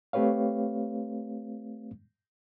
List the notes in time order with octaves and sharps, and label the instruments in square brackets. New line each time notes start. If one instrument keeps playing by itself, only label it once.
[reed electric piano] A3 C4 G4 B4 C#5 F5